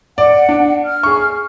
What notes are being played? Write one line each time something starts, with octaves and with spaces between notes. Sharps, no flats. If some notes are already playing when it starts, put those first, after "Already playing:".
D5 F#5
D4
F6
G#4 C#6